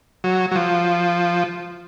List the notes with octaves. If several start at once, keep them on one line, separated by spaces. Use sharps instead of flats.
F#3
F#3
F3